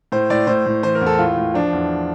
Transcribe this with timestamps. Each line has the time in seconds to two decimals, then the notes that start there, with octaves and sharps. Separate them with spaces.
0.12 A2 C5
0.30 A2 D5
0.47 A2 C5
0.66 A2
0.83 E3 C5
0.95 A#4
1.01 E2
1.07 A4
1.19 A2 F4
1.37 A2
1.54 F3 D4
1.73 E2